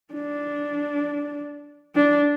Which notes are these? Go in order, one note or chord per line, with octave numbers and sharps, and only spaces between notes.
D4
D4